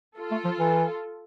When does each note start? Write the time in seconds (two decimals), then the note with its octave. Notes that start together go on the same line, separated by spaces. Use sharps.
0.17 F4 A4
0.31 A3
0.45 F3
0.59 E3